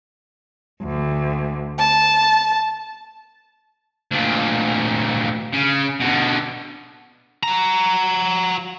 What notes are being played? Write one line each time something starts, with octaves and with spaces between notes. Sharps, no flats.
D2
A5
D2 A#2
C#3
B2 D3
F#4 A#5